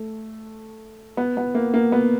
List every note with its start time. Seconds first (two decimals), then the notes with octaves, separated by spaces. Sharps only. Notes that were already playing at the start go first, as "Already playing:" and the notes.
Already playing: A3
1.17 B3
1.37 B3
1.55 A#3
1.74 A#3
1.92 B3